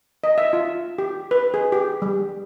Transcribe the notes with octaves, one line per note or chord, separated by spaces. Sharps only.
D#5
E5
F4
G4
B4
G#4
G4
G3